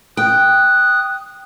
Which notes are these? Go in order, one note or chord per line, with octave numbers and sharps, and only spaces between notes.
G5 D#6 F#6